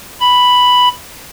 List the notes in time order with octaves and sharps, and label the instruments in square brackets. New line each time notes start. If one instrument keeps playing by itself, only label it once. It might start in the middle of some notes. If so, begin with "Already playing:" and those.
[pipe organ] B5